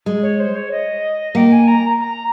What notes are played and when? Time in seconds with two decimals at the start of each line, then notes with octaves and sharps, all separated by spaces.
0.06 G#3
0.22 C#5
0.39 C5
0.55 C#5
0.71 D#5
1.35 A#3 G5
1.52 G#5
1.67 A#5
2.00 A#5